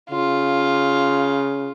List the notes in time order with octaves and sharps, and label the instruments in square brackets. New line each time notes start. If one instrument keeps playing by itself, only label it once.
[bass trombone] C#3 [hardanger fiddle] F4